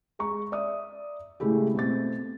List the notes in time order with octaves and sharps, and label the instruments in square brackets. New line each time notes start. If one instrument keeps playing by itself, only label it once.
[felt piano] G#3 A#5 C#6
D5 E5 D#6
A2 C#3 G#3 A3 E4 G4
B2 A3 C4 A6